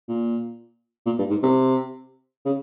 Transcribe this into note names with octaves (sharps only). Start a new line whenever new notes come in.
A#2
A#2
G2
G#2
C3
C#3